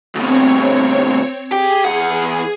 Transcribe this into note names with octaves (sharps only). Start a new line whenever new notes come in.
D2 B2 C4 C#5
G4 G#4
E2 F#5